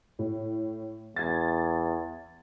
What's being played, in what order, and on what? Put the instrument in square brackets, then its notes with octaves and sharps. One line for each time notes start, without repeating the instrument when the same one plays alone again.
[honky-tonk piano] A2
[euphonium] E2 [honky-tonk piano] G#6 A6